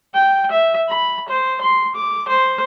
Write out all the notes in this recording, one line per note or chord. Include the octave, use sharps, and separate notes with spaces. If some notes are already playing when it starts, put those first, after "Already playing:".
G5
E5
B5
C5
C6
D6
C5